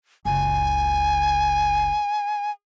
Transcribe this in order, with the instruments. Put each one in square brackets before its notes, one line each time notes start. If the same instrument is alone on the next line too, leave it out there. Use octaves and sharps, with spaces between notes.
[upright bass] F#1 C#2 [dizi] G#5